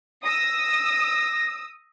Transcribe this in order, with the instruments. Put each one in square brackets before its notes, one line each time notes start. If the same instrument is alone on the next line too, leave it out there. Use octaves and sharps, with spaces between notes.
[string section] D#6 E6 [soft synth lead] A#6